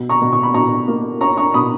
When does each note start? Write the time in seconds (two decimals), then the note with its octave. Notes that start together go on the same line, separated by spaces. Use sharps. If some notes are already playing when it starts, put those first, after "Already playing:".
Already playing: B2
0.09 A#5 C#6
0.22 B2
0.33 C#6
0.43 B5
0.54 B2 A#5 C#6
0.88 A#3
1.21 C#4 A#5 C#6
1.37 A#5 C#6
1.54 B2 B5 D#6